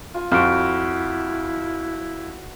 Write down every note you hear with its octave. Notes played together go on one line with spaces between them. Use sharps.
F4 G#5 C6
F2 E4 F#4 B5 F6 D7